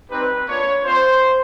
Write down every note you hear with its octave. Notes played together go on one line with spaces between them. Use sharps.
G3 C4 D#4 G4 B4
A#3 D4 F4 C#5
C4 F4 C5